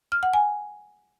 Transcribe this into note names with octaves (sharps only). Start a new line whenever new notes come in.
F6
F#5
G#5